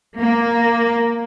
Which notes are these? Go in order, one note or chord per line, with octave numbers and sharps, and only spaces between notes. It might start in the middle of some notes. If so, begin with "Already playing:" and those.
A#3